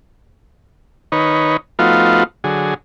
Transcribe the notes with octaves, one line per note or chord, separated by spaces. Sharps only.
D#3 D#4 B4 C#5
F3 A3 B3 D#4 F4 F#4
D3 F#3 G#4